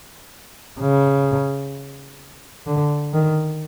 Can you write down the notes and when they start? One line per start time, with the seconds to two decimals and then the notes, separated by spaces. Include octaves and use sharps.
0.80 C#3
2.67 D3
3.14 D#3